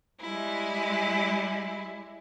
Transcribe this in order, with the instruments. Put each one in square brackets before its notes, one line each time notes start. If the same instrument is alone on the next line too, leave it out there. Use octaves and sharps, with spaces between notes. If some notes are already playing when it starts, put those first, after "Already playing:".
[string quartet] G3 G#3 E4